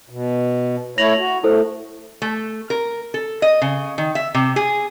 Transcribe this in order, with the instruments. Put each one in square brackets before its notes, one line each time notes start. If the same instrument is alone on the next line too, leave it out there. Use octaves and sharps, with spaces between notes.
[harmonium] B2
[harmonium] A3 E4 C#5 [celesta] A#6 F7 F#7
[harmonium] F#4
[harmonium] A3 [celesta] E4 A4 C5
[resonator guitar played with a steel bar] A3
A#4
A4
D#5
C#3
D#3
E5
C3
G#4